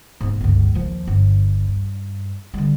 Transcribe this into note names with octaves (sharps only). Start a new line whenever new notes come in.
G#2 B3
G1 C#2
D#2 F3
G1
G2
D3 G3